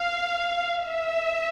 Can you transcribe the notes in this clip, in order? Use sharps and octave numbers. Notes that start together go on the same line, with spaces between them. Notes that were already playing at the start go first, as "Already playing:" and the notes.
Already playing: F5
E5